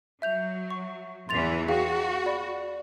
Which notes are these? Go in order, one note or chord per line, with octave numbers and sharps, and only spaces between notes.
F#3 E5 G6 F7
C#6
E2 E3 C6 A6 F7
F#4 G#4 F5 G5
D5 B5